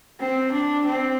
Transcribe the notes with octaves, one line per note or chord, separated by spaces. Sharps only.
C4
D4
C4